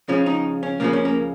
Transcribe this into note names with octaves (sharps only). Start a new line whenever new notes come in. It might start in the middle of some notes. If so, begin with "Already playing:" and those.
C#2 C#3 F3 C#4
D#4
C#4
C#2 C#3 F3 A#3
C#4
A#3